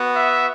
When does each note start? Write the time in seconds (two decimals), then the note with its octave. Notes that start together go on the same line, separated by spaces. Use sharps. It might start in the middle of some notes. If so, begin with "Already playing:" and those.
Already playing: B3 F#4
0.14 E5